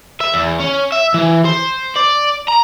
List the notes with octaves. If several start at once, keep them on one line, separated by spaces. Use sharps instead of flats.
E5
E2
C#4
E5
E3
C5
D5
A#5